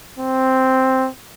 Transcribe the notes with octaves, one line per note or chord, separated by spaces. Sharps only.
C4